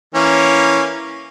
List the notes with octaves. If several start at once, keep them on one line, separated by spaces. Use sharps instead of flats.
E3 A#3 C#4